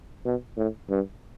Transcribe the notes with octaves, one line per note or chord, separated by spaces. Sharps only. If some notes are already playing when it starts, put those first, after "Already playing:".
B2
A2
G2